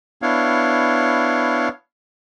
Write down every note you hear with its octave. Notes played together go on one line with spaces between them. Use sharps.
B3 D4 E4 C#5 F5